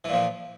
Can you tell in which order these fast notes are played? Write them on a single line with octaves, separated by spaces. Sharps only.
E3 A#2 F3